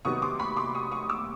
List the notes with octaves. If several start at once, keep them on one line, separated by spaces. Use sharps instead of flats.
C3 D#3 F#3 B3 C#6 D#6
C6 D6
B5 C#6
C6 D6
C#6 D#6
C#6 D#6
D6 E6